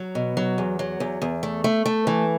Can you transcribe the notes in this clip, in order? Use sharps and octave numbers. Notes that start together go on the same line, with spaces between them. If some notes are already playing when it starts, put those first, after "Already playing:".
Already playing: F#3
B2
F#3
E2
F#3
E2
E2
A3
A3
A3
E3